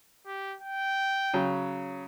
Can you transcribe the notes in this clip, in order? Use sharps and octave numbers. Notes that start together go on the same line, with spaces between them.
G4
G5
C#3 F#3